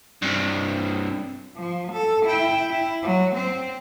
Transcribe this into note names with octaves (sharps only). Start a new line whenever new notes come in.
G2 C3
F3
A4
E4 G5
E4
F#3
C4